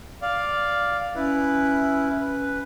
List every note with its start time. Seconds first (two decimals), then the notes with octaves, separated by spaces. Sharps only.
0.22 D5 F5
1.15 C#4 E4 B4
2.20 B4